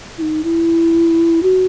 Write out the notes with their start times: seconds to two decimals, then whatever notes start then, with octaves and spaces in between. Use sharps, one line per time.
0.18 E4
0.22 D#4
0.44 E4
1.43 F#4